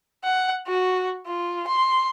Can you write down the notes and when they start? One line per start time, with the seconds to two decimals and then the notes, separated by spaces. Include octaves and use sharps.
0.23 F#5
0.67 F#4
1.27 F4
1.67 C6